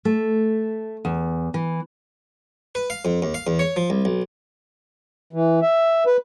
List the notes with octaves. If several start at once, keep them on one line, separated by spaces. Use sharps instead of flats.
A3
E2
E3
B4
F5
F2
D#2
F5
E2
C#5
F3
C2
B1
E3
E5
B4